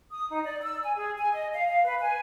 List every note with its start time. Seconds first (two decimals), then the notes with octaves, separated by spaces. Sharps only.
0.11 D#6
0.30 D#4
0.45 D5
0.62 E6
0.83 G#5
0.96 G#4
1.18 G#5
1.32 D#5
1.53 F5
1.67 F5
1.84 B4
2.01 G#5